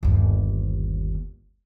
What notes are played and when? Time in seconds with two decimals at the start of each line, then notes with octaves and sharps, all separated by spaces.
0.03 G1 D#2